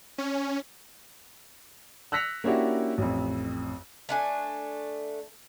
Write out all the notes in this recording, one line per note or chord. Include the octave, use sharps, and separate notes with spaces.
C#4
E6 F#6 A#6 B6 C#7 F7
A#3 C#4 D4 E4 F#4 G4
A1 F2
A3 D4 G#5